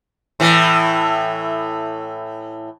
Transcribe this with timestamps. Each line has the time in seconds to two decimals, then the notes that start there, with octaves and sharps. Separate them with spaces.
0.40 A2 E3